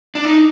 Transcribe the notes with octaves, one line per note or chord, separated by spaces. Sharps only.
D4
D#4